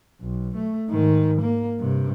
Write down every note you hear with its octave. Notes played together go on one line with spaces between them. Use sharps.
B1
A3
G#2 D#3
A#3
G2 C3